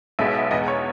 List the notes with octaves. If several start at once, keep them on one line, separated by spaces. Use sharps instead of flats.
B1 B2 G#3 B3 E5
E2 B2 G#3 B3 D#5
C#5